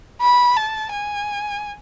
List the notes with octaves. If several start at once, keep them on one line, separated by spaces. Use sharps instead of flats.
B5
A5
G#5